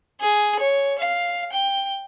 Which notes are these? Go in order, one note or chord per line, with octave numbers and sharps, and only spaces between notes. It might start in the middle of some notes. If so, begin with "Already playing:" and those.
G#4
C#5
F5
G5